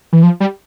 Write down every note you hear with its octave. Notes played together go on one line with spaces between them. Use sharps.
E3
F3
G3